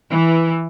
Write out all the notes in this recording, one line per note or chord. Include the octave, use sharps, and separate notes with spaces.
E3